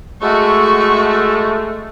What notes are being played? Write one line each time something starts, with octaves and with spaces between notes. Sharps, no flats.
G#3 A3 F#4 C#6